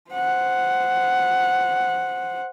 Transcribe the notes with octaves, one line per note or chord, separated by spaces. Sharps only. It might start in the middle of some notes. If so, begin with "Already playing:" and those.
C5 F#5